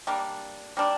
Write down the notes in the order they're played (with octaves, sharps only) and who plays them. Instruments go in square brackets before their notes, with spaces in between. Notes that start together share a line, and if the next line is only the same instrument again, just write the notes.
[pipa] G3 A#3 D4
G3 A#3 D4